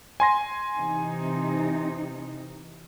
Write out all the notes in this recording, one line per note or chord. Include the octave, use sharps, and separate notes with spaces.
G#5 C6 A#6
C3 E3 D#4